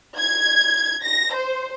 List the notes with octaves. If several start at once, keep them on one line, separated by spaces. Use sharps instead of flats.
G#6
A#6
C5